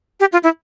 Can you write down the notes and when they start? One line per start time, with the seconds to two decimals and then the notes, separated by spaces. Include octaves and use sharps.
0.20 G4
0.32 F4
0.43 E4